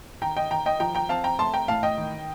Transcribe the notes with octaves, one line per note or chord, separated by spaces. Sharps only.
D#3 G5 A#5
D#5 G5
D#3 G5 A#5
D#5 G5
F3 G5 A#5
G5 A#5
C4 F5 A5
G5 A#5
A3 A5 C6
G5 A#5
A2 F5 A5
D#5 G5
D#3